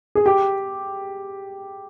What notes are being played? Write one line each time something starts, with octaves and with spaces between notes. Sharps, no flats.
G#4
G4